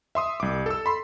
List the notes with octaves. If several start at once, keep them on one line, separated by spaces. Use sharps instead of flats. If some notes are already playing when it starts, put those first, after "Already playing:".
E5 C6 D#6
C2 D6
A4 E6
B5 C6